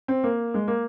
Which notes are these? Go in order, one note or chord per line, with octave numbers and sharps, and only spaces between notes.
C4
A#3
G#3
A#3